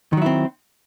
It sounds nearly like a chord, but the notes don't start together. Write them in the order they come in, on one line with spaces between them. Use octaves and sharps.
D#3 F#3 E4 C4